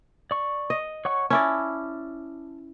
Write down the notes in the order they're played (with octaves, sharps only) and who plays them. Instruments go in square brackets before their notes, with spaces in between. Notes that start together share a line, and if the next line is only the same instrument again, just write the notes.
[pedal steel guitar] D5 C#6
[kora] D#5
[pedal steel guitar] C#5 F#5 C#6
[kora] C#4 E4 D5 [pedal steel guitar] A5